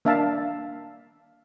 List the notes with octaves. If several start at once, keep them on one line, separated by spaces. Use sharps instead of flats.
A#3 D4 E5 F5 A5